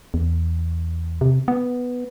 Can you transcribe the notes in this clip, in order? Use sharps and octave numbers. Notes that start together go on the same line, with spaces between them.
E2
C3
B3